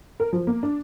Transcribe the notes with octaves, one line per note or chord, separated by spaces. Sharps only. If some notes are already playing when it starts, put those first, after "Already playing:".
A#4
F3
A#3
D4